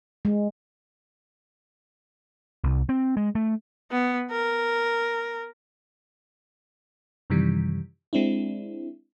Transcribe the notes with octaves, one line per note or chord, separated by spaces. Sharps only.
G#3
C2
C4
G#3
A3
B3
A#4
F#2 C3 D#3 E3 G3
G#3 C4 D4 E4